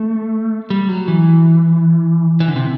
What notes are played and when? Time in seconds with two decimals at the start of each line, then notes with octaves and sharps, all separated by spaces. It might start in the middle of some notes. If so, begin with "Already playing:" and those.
Already playing: A3
0.70 G3
0.89 F#3
1.08 E3
2.40 E3
2.48 D3
2.56 C3